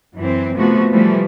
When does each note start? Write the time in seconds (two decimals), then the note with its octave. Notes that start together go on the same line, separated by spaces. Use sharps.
0.15 F#2 E3 C4
0.54 C3 F3 A3 B3 F#4
0.92 E3 F3 G3 A3